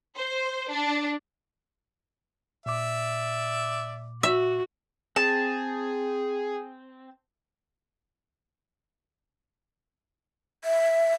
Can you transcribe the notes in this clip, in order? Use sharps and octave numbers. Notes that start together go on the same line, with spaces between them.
C5
D4
A#2 D5 E5 D6
F#4 E5
C4 G#4 A5
E5